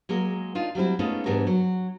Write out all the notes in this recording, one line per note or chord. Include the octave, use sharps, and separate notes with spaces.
F#3 G#3 A#3 A#4
D4 D#4 F4
F#3 G3 C4 E4
G#3 A3 B3 C#4 D#4 F4
G#2 E3 G3 B3 D4 A#4
F#3